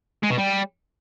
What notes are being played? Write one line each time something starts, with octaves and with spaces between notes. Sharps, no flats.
G#3
B2
G3